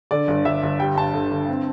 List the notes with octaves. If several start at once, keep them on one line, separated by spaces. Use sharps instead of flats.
D3 D5
G1
G1 E5
G1
G3 G5
G2 A5
D3
D3
C4